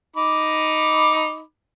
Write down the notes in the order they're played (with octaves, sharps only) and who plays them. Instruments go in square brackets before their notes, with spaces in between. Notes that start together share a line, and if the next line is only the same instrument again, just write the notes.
[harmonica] D#4 B5 D6